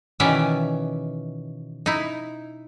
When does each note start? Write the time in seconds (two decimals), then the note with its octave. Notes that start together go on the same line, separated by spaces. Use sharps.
0.20 B2 D#3 E3 C#4 D5 E5
1.86 D#4 E4